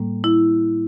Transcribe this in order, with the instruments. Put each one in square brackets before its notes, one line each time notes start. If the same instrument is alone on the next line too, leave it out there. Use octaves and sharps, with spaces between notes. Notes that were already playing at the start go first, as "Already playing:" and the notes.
Already playing: [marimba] A2 G3 A#3
E4